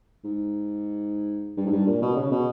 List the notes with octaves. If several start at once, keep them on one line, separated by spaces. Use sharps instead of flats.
G#2
G2
G#2
G2
A#2
B2
C#3
B2